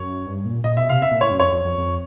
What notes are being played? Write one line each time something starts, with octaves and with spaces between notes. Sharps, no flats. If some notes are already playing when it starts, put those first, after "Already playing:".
Already playing: F#2 C#5
G2
A#2
A#2 D#5
B2 E5
C3 F5
E5
A#2
A2 C#5
F#2
F2 C#5
F2
F2
F2